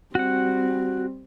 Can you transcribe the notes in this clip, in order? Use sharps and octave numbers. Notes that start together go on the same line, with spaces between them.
G3 C4 F#4 F#5